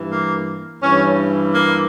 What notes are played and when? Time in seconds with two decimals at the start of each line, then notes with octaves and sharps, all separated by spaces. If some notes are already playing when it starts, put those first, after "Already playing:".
Already playing: G2 E3
0.11 A#3
0.82 G2 E3 C#4
1.53 A#3